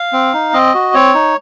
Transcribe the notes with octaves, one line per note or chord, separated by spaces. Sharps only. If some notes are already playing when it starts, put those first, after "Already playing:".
Already playing: F5
C4
D#4
C4 D#5
F#4
C4 C#5
D#4